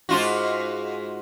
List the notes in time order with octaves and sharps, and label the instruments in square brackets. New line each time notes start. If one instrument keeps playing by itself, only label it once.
[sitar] G#2 F4 F#4